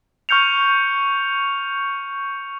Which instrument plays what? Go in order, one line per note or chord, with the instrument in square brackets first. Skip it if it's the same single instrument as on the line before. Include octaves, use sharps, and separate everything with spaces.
[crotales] C#6 F6 G6 C#7 F7